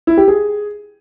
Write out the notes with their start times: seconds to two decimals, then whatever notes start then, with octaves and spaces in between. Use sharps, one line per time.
0.07 E4
0.17 G4
0.28 G#4